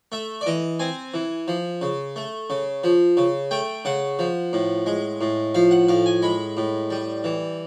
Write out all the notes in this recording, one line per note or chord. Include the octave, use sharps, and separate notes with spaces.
A3 E5
D5
E3 D#5
C4 G#5
E3
F3
C#3
A3
C#3
F3
C#3
A3 G5
C#3 F#5
F3
A2
G#3
A2
F3 F5
F#5
A2 F5
G#5
G#3 B5
A2
G3
E3